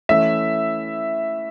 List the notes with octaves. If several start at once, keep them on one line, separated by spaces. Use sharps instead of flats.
E3 A3 C#4 E5